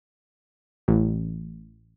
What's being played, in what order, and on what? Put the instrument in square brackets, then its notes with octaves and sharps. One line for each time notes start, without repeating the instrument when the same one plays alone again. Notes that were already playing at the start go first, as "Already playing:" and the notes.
[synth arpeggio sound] A1